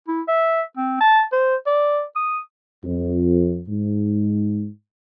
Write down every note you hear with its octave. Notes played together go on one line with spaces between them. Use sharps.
E4
E5
C4
A5
C5
D5
D#6
F2
G#2